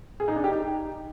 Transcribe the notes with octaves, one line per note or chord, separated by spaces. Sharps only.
G#4
D#4
D4
G4
D#4